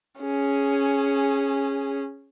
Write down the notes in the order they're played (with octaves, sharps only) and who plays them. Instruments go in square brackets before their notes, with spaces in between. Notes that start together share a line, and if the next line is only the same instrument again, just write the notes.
[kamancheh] C#4 G#4